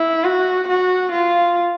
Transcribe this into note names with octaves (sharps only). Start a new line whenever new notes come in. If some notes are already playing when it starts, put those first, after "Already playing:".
Already playing: E4
F#4
F#4
F4